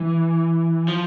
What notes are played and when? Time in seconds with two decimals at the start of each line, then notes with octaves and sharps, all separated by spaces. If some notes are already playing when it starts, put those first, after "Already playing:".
Already playing: E3
0.88 F3